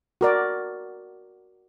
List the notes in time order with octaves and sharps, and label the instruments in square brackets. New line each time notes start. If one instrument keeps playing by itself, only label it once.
[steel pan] F#4 A#4 D5